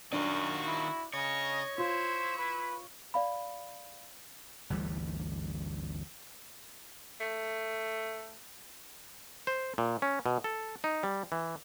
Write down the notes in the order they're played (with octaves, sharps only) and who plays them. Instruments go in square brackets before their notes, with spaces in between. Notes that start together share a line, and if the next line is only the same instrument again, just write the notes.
[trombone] F#2 [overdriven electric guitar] D#3 F4 [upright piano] D4 [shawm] F#4
[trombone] E4
[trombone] C#3 [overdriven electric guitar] C#5 [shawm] D#5
[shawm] E4 [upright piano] F4 [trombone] C5
[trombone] B4
[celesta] D5 F5 B5
[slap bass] G1 D2 E3 G3
[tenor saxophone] A3
[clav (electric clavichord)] C5
A#2
C#4
B2
A4
D#4
G3
E3